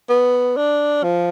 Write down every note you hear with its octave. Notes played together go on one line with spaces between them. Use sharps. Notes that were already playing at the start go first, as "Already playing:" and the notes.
B3
D4
F3